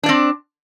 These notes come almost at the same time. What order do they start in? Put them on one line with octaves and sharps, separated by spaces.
D4 D5 C4